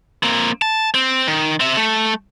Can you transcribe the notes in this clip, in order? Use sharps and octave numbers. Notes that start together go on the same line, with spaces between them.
A#3 C4
A5
C4
D#3
C4 E5
A3